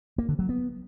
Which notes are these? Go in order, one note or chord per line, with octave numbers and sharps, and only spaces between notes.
A#3
D3
F#3
B3